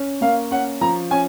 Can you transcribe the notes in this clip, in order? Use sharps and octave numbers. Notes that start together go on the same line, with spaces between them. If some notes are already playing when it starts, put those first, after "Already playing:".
Already playing: C#4
A#3 F5
C#4 F#5
F3 A#5
C#4 G#5